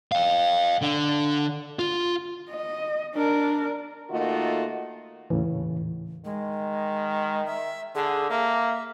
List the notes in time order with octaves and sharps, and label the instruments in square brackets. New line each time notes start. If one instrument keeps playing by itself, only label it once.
[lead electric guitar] F5 G5
D3
F4
[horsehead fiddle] D#5
D4 A#4
[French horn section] D#3 A3 A#3 F4 F#4 D#5
[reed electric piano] D#2 A2 C#3 [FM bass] E3
[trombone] D#3 [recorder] G#3
[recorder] E5
[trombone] D3 [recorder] G#4
[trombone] A#3 [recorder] E5